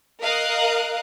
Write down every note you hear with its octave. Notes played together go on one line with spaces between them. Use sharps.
A#4 D#5 F5 D#6 F#6